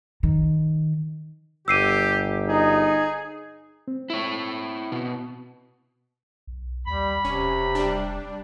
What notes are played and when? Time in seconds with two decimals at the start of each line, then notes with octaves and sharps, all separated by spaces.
0.23 D#3
1.68 G1 G4 E6 C7 D#7
2.48 D#4 G#4
3.88 C4
4.10 E4 C#5
4.92 B2
6.47 B1
6.87 D#2 G3 B5
7.25 E1 C3 C#4
7.75 G3 D4